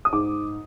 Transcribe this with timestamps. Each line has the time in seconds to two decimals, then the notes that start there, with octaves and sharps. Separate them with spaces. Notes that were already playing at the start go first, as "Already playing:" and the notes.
0.05 D#6
0.12 G#2 D6